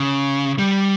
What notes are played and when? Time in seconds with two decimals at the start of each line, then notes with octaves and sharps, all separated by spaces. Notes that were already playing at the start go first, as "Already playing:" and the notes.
Already playing: C#3
0.59 G3